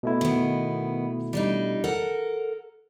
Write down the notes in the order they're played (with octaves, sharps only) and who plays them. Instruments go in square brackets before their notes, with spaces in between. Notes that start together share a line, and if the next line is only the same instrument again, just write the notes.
[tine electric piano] B2 A3 E4
[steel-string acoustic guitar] D#3 B3
G3 D4 D#4
A4 A#4 F#5